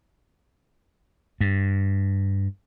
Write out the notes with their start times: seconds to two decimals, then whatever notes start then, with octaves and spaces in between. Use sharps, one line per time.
1.41 G2